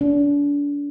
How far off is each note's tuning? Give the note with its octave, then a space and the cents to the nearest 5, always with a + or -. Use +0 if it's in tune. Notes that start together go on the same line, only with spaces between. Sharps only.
D4 -35